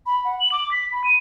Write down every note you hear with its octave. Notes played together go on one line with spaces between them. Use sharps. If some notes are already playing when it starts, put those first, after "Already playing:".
B5
F#5
F#7
D6
B6
B5
D#7